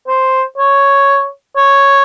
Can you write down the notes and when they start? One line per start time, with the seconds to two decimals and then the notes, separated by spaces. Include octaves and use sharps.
0.08 C5
0.58 C#5
1.56 C#5